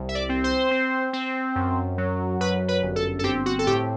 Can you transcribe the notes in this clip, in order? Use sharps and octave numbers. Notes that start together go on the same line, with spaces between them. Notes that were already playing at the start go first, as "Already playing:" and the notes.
Already playing: C2
E5
D5
C4
C5
C4
C4
F#2
F#3
F#2 B4
B4
G1
A4
A4
C4 G4
F#4
A4
A2 G4